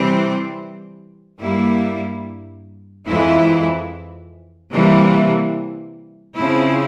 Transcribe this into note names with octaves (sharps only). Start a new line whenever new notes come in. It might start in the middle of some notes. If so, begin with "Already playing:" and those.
Already playing: C3 E3 G3 C4
G2 G3 A#3 E4
F2 E3 G#3 E4
C3 E3 G3 A#3
C#3 F3 C4 E4